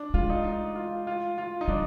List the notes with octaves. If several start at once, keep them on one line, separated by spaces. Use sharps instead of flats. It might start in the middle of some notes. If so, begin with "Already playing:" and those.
Already playing: D4
G#3 F4
D#4
D#4
F4
F4
F4
D#4
G3 D4